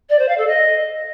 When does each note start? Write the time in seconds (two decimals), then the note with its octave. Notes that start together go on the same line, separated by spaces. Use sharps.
0.09 D5
0.19 C5
0.28 F5
0.38 A4
0.47 D#5